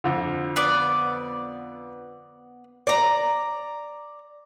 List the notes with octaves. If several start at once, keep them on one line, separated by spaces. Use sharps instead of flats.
F2 D3
B3 D5
D5 A#5